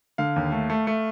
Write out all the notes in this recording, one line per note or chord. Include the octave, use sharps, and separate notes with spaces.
D3 F5
D#2
A3
A3
A3